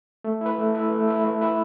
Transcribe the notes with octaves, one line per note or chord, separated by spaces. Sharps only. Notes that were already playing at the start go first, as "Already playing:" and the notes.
A3
E4 B4
A3
E4 B4
A3
E4 B4
A3
E4 B4